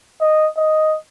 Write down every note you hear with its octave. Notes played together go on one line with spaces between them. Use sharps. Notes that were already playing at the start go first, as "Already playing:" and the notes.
D#5
D#5